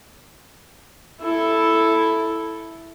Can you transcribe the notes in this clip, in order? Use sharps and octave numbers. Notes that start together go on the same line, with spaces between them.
E4 A4